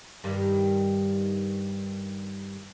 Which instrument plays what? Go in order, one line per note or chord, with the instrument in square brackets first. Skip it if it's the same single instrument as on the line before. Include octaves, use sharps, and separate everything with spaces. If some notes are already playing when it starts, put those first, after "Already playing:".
[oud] G2 D#3 G3